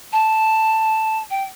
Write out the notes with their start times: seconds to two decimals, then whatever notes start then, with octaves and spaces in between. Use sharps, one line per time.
0.12 A5
1.30 G5